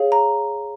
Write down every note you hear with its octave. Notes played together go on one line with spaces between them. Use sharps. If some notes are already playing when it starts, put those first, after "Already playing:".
Already playing: G#4 C#5 F5
A#5